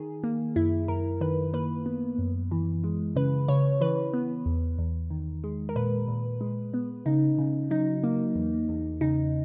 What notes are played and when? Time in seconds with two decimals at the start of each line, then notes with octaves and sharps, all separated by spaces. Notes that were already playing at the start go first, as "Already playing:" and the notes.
Already playing: D#3 G#4
0.24 A#3
0.56 F#2 E4
0.88 F#2 A#4
1.21 D#3 B4
1.53 A#3 B4
1.86 B3
2.19 F#2
2.51 E3
2.84 G#3
3.16 C#3 B4
3.48 C#3 C#5
3.81 E3 B4
4.13 B3
4.46 E2
4.78 E2
5.10 D#3
5.44 G#3
5.69 A#4
5.76 A#2 B4
6.08 A#2
6.41 G#3
6.74 B3
7.06 C#3 D#4
7.38 C#3
7.70 F#3 D#4
8.04 A#3
8.35 E2
8.69 E2
9.01 C#3 D#4